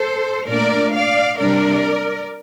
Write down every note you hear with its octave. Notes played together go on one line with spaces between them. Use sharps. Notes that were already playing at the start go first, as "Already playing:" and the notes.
Already playing: A4 C5
A#2 A3 D4 A#4 D5
D5 F5
C3 G3 D4 A#4 D5